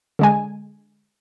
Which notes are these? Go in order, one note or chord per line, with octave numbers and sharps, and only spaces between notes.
D3 G#3 G#5